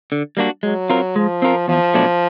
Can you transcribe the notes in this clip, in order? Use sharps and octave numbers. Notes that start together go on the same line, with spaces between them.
D3
G3 A#3 D4 F#4
F#3 G#3
C4 F4 A#4
F3 G#3
C4 F4 A#4
E2 F3
B2 F#3 A3 D4